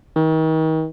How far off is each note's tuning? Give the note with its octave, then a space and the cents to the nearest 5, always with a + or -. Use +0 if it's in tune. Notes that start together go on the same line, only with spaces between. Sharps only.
D#3 +35